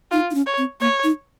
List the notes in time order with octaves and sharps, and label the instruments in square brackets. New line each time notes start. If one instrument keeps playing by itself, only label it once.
[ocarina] D#4 [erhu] F4
[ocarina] D#4
C#4
[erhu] C#5
[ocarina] C4
[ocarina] A#3 [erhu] C#5
[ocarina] D#4